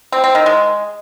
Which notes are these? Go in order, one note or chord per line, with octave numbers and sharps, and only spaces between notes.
C4
C4
D#3
G#3